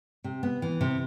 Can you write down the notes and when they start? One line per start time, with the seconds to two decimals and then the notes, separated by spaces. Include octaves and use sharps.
0.24 C3
0.43 B3
0.62 E3
0.81 C3